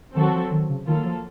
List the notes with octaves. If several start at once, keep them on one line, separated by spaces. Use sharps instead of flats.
D#3 F#3 C4 F#4 A4
F3
D#3
C#3
D#3 F#3 A#3 F4 A4
F3